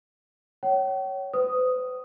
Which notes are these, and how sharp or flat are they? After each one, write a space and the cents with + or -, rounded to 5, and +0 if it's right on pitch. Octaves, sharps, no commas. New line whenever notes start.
C#5 +0 G5 -45
B4 +45 D#6 +0